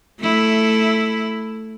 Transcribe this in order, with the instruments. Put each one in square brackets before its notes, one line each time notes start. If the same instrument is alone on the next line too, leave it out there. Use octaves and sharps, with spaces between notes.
[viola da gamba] A3 E4